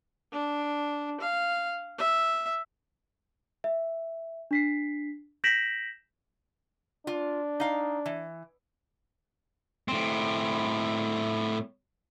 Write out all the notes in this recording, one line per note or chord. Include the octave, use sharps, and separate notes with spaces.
D4
F5
E5
E5
D4 B6 C7
G6 A#6 B6 D7 E7 F#7
D4 F4
D#4 F5
E3
A2 C4